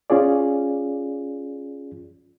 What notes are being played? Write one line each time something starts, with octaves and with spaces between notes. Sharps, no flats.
C#4 F4 G#4 D5